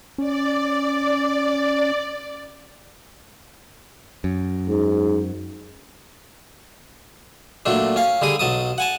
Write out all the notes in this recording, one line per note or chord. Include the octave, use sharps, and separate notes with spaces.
C#4 D5
F#2
G#2
A#2 F#3 A3 D4
C#4 F5
D3 G3 G#4 D#6
B1 F#3 A5 D#6
F#5 G#5 A5